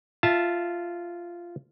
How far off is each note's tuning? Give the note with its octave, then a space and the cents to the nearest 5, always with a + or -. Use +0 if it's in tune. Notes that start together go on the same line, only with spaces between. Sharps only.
F4 -10 E5 +0 A5 +0